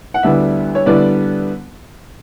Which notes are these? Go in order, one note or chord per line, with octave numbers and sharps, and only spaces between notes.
F#5
D2 D3 G3 B3 E4 E5
C#5
D3 G3 B3 E4 D5